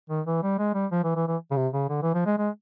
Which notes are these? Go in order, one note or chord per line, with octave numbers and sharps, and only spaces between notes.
D#3
E3
G3
G#3
G3
F3
E3
E3
E3
C#3
C3
C#3
D3
E3
F3
G#3
G#3